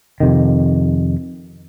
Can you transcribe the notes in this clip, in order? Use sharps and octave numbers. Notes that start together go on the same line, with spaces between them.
F2 C3 D#3